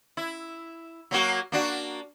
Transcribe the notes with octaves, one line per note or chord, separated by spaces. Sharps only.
E4
F#3 A#3 F#4
A#3 D4 F#4